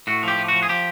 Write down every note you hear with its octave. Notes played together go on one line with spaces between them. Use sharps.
A2 F#4
F3 G4
A2
F3 F#4
G#4
F3 G4